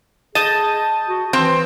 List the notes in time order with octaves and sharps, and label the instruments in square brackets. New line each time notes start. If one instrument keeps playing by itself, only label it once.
[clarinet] G#4 [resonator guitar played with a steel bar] D#5 [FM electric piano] A5 D#6 G6
[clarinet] F#4
[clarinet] E3 [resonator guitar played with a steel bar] C4